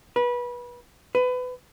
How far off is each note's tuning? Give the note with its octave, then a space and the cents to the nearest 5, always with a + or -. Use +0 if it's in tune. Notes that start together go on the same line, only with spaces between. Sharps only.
B4 -25
B4 +25